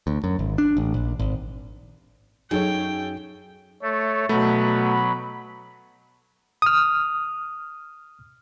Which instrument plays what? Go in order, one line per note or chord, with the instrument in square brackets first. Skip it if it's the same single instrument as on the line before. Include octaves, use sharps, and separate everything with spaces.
[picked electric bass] D2
F#2
G#1
D4
A1
A#1
G#1
[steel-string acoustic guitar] F#2 [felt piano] D#4 [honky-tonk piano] G#4 A4 C#5 [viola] G5
[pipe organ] A3 A4 [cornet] C#5
[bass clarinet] B2 [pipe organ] F#3 B5 [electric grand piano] A3 [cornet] B3
[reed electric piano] D#6 F6